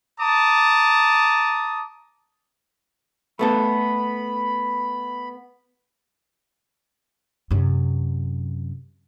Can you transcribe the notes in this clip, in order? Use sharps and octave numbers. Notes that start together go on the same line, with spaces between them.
A5 A#5 D6 D#6
A3 B3 A4 B5
F#2 C3